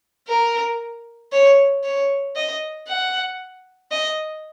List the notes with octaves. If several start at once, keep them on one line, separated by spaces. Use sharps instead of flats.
A#4
C#5
C#5
D#5
F#5
D#5